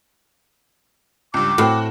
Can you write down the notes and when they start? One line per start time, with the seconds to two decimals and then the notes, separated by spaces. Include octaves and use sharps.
1.34 C#2 G2 D6
1.58 A2 C4 F#4